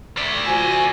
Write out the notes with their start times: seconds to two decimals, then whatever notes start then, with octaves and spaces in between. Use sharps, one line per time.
0.18 D5 E5
0.47 F3 F#4 G#5